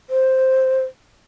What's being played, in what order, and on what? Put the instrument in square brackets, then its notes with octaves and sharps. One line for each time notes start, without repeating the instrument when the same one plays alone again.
[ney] C5